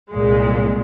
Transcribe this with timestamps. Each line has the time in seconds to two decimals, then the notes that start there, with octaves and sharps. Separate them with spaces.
0.12 C2 A#2 G#3